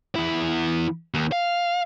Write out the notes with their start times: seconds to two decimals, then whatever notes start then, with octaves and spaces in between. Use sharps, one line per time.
0.15 E2 E4
1.14 D#2
1.32 F5